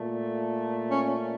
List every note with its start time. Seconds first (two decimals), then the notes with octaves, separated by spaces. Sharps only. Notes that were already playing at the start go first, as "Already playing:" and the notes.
Already playing: A#2 A3
0.91 C#4